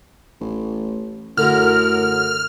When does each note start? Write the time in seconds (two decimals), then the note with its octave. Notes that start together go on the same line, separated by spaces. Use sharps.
0.41 A1
1.37 F#2 A2 D3 A#4 F6